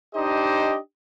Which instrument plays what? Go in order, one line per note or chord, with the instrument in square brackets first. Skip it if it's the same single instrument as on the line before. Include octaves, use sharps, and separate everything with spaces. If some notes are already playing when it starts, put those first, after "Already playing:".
[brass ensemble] D4 D#4 G4 C5 D#5